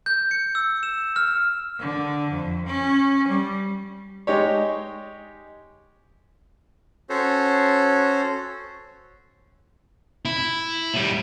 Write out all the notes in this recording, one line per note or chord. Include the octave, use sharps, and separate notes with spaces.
G6
C#7
E6
E7
F6
D3
F2
C#4
G3
G#3 D#4 G4 C#5
C#4 F#4 A4 C5 C#5
E4
A2 G3